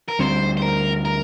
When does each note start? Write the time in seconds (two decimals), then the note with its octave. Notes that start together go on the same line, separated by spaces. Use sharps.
0.08 A#4
0.19 D2 D3 G3 C4 C5
0.57 C5
0.62 A#4
1.05 A#4